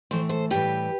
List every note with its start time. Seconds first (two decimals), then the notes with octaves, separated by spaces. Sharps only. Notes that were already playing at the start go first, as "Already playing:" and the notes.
0.11 A2 E3 A3 C5
0.29 A4 C5
0.50 A2 E3 G3 G4 B4